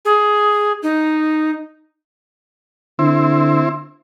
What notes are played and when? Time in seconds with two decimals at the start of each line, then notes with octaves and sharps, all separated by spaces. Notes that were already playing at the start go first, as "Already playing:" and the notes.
0.05 G#4
0.83 D#4
2.99 D3 C4 E4